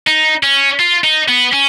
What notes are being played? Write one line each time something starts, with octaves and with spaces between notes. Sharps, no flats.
D#4
C#4
F4
D#4
B3
C#4